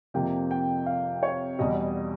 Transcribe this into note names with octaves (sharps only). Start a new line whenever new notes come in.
F2 C3 F3 A#3 G5
G5
F5
C#5
E2 B2 G3 D#5